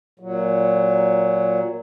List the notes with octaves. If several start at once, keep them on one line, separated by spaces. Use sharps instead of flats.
A#2 F#3